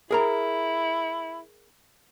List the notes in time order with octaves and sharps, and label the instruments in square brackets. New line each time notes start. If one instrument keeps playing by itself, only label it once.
[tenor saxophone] E4 [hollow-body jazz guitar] G#4 A#4 A#5